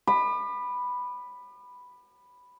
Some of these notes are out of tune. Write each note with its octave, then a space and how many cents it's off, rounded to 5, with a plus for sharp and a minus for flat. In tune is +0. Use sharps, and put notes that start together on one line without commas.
B5 +0 D6 +45